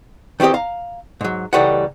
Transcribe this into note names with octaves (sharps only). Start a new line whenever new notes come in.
D#3 E3 C4 G4 D#5
F5 A#5
G#2 F#3
C#2 E3 G3 A3 D#4 F#5